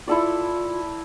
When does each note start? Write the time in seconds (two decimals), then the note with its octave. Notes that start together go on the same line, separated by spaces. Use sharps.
0.08 E4 F4 A4 D5